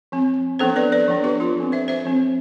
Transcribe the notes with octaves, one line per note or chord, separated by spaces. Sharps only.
F3 C4
F3 B3 D4 A4 C5
B4 D5
B4 D5
F3 B3 D4
G4 B4
F4 A4
F3 C4
C5 E5
C5 E5
F3 C4